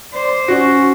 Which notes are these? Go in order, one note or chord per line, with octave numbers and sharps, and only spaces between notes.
C5 D5
C#4 F#4